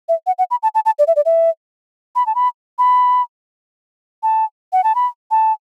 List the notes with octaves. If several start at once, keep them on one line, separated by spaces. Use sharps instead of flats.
E5
F#5
F#5
B5
A5
A5
A5
D5
E5
D5
E5
B5
A5
B5
B5
A5
F#5
A5
B5
A5